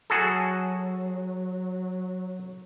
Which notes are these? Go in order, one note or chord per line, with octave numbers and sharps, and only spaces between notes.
F#3 F#4 G#4 A4